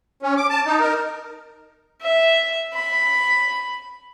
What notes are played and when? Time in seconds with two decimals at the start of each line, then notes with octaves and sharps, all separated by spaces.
0.22 C#4
0.37 D6
0.50 A5
0.66 D#4
0.80 A#4
2.02 E5
2.74 B5